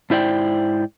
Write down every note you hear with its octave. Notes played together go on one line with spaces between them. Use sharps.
G#2 E4 C5 D5 G5